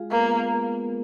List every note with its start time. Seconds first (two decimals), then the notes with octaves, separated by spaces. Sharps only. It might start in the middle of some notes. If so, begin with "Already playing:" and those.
Already playing: G#3 F4 G#4 F5
0.12 A#3 B3 B4
0.41 A#3 A#4